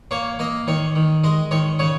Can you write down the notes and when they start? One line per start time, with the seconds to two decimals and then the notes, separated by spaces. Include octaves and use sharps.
0.11 A#3 C#5
0.39 A#3 D#5
0.67 D#3 C#5
0.95 D#3
1.24 G#3 D#5
1.51 D#3 C#5
1.79 C#3 C#5